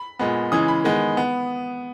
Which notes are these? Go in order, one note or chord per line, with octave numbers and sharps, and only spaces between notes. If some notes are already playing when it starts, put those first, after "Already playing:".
Already playing: B5
A#2 G#3 B3
C#3 E3 G#3 D#6
B5
D#3 G#3 B3
B3